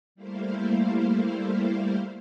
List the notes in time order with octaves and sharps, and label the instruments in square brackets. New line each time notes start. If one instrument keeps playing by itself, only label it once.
[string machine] G3 A3 A#3 E4 C5 F5